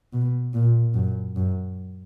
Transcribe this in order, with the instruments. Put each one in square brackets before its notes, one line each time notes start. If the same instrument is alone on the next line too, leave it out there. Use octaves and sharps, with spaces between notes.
[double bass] B2
A#2
F#2
F#2